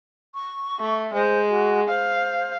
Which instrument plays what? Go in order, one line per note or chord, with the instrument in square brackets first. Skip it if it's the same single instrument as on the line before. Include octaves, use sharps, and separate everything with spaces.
[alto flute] C#6
[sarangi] A3
[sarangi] G#3 [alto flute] C5
[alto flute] F#4
[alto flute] C5 [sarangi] F5